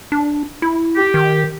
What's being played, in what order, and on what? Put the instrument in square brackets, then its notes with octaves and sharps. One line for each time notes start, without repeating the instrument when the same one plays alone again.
[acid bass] D4
E4
[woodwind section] G4
[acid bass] D#3